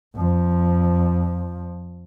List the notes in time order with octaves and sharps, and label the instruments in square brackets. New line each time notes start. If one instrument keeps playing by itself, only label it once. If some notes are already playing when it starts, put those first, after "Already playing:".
[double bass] F2 F3